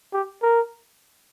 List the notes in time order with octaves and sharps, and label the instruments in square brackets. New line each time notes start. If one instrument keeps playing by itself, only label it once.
[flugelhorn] G4
A#4